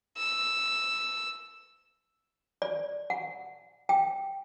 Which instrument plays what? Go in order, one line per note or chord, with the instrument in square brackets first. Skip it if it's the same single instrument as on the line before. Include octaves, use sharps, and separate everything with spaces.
[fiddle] E6
[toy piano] D5
F#5
G5